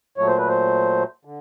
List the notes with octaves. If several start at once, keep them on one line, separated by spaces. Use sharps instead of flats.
A#2 F#3 A3 C#5
C5
B4
C5
D3